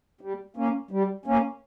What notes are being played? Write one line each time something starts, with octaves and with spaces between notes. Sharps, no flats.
G3
A#3 C#4
G3
A#3 C#4